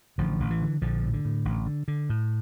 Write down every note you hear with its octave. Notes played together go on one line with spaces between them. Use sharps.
A1 D3 F3
A1
E3
D3
A#1 D3 F3
A2
D3
A2
A1
D3
D3
A2